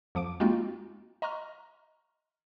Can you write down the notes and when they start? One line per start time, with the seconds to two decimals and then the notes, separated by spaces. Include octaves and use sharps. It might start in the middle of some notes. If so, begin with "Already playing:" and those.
0.15 F2 F3 D6 D7
0.40 G#3 A#3 C4 D#4 F4 F#4
1.22 D#5 A#5 C6 C#6 F6